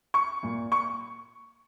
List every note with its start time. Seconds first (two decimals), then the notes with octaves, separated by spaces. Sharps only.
0.14 C#6
0.43 A#2
0.72 C#6